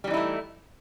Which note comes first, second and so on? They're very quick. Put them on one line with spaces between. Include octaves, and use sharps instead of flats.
G3 E3 D#4 E4 A3